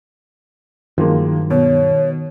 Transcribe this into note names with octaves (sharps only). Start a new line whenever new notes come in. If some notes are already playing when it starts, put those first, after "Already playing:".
G2 D#3 F3 F#3 G#3 A#3
B2 C#5